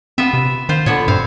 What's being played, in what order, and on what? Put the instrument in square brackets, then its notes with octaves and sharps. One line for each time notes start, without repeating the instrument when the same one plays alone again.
[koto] B3 F4 E5 [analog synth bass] C4
[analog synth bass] C3
[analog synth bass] D#3 [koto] F4 C5 F5
[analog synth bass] A#2 [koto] D3 B3 C#5
[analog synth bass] G2 [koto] C4 F5